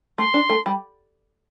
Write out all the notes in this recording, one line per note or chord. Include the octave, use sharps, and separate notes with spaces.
A3 C6
D4
A3
G3